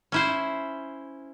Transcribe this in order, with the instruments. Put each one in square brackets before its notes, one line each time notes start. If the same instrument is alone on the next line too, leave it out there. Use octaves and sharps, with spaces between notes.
[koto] C#4 E4 C5